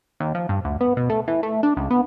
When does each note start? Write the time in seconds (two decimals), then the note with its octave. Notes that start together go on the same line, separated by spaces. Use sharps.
0.20 D#2
0.35 F3
0.49 G2
0.65 D2
0.81 B3
0.97 B2
1.09 A3
1.28 E3
1.43 A3
1.63 D4
1.77 C#2
1.90 B3